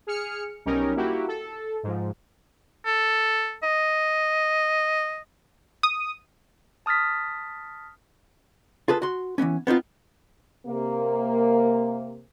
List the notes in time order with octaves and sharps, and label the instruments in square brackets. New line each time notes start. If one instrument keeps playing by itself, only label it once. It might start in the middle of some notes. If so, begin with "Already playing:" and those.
[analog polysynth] G#4 F6 C#7
B1 G3 C#4 D#4 A#4
A#3 E4 F#4 G4
A4
G#2 F3
[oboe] A4
D#5
[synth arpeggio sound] D#6
[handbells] A5 D#6 F6 A6 B6
[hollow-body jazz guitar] F4 G#4 A4 B4
F#4 C6
E3 F3 B3 C#4
B3 C4 D#4 F4
[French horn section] C3 A#3